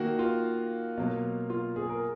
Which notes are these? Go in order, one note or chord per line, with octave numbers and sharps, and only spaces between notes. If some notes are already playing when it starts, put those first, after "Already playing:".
Already playing: D#3 A#3 F#4
F4
B2 F#3 A#3
F4
G#4
A#4